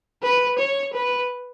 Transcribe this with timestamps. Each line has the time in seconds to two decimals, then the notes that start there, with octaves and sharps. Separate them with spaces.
0.23 B4
0.59 C#5
0.93 B4